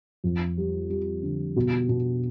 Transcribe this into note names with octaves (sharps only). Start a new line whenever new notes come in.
F2
G3
G3
D3
B2
B2